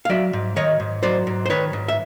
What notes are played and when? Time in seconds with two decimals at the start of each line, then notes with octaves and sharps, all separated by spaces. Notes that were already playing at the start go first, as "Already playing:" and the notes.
0.05 F5
0.09 F#3 D5 E5
0.33 G#2
0.56 D#3 C#5 D#5
0.80 G#2
1.03 F#3 C5 D5
1.27 G#2
1.46 C5
1.50 D#3 B4 C#5
1.73 G#2
1.88 E5